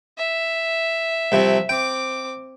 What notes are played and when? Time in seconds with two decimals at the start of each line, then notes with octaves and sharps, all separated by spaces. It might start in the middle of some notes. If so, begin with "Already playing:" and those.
0.17 E5
1.32 C2 C3 F3
1.69 C4 G5 D6